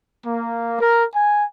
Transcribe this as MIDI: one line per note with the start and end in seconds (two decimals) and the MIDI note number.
0.24 0.79 58
0.79 1.03 70
1.13 1.43 80